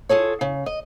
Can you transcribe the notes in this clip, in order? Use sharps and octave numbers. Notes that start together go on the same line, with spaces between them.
F4 G#4 A4 C#5
C#3
D#5